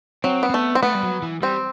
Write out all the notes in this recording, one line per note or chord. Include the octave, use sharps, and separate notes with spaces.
F#3 C4
B3
C4
A3 B3
C4
A3 B3
G3
F#3
E3
G3 C4